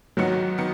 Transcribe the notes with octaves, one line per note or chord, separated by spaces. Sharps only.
G#2 D#3 F#3 B3 D#4 F#4
D#3 B3